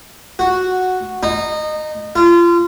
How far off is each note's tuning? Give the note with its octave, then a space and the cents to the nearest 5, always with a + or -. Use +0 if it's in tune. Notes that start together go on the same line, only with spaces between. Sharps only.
F#4 -5
D#4 -20
F4 -30